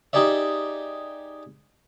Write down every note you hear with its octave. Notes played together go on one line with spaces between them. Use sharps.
D#4 G4 G#4 D5 E5